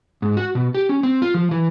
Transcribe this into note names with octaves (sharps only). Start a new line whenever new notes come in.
G#2
F#4
B2
G4
C#4
C4
F4
F3
E3